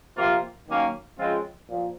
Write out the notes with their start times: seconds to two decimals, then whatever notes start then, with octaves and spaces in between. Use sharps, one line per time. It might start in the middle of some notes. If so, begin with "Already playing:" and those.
0.17 C3 F3 A#3 F4
0.67 D#3 F#3 A#3 C#4
1.18 C#3 F3 G#3 C4 F4
1.68 A#2 F3